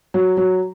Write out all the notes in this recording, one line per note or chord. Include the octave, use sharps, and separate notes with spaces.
F#3
F#3